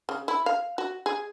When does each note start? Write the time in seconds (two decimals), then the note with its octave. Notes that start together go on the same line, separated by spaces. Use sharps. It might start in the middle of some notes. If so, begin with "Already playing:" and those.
0.09 C#3
0.28 E4
0.46 F5
0.78 F#4
1.06 G#4